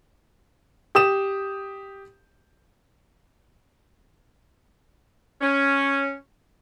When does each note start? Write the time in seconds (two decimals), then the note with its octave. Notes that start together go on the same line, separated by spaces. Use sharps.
0.95 G4 D#6 E7
5.41 C#4